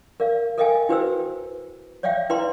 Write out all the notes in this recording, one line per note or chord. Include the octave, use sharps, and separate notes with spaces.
A#4 D5 F5
A4 A#4 D#5 F5 G5 G#5
E4 F#4 B4 C5 G5 E6
C#5 D5 E5 F5 G5
E4 B4 D5 G5 A#5 C6